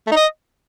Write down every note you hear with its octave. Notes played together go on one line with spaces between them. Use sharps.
A3
D#4
D#5